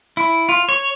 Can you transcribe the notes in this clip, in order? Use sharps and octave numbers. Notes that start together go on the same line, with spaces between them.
E4
F4
C#5